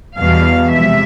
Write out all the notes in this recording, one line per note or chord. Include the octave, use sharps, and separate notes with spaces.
E2 B2 G3 F5
C3 F3 G#3 E5